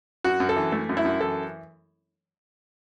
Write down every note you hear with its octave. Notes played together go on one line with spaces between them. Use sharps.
F#2 F#4
F#2
A4
E3
A3
F#2
E4
F#2
E3 A4